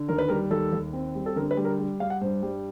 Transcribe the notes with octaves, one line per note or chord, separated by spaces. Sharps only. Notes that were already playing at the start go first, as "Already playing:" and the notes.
Already playing: D3
D#2 A#4
B4
G3 A#4
D#2 A4
D#2
C4
G3
A4
D3 A#4
B4
G3
A#4
G3
G3 F5
F#5
G2 C5
G3